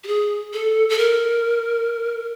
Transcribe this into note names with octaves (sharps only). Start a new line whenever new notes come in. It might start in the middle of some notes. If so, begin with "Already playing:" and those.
G4
G#4
A4
A4
A#4